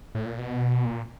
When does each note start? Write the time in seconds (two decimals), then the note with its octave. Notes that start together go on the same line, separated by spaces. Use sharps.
0.15 A2
0.26 A#2
0.38 B2
0.85 A#2